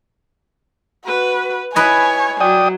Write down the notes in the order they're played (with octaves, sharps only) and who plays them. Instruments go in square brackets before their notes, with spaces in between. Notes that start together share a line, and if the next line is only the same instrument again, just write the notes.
[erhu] F#4 [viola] B4
[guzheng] E4 B4 D#5 [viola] C#5 [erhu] G#5
[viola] F#3 [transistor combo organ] D5 G5 D#6